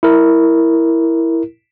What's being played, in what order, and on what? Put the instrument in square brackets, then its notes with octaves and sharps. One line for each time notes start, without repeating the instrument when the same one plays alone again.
[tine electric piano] E4 A#4